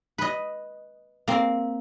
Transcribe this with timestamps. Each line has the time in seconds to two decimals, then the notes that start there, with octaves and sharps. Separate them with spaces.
0.18 B4 D#5
1.28 A#3 C4